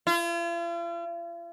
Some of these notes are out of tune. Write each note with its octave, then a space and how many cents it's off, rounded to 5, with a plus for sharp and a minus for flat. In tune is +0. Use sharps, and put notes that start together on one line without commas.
F4 -45